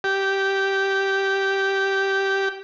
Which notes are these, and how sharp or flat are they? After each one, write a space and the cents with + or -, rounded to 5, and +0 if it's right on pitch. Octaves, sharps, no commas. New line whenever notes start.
G4 -10